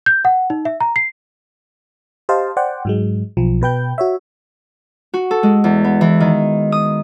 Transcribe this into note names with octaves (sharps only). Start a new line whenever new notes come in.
G6
F#5
D#4
E5
A#5
C7
G4 C5 D#5 F5 A5
C5 D5 F#5 G5
G#2 F#3 G#3
B1 F3
B2 B4 G5 G6
F#4 C#5 E5
F#4
A4
G#3
E2
B3
E3
D#3
D#6